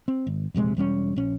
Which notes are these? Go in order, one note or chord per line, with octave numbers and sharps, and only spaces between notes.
C4
G#1
E1 A#1 C3 G#3
E1 G3 A3 C#4
A#1 C#4